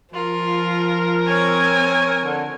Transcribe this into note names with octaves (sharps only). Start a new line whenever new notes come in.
F3 F4 A#4
C4 C#5 G#5
D3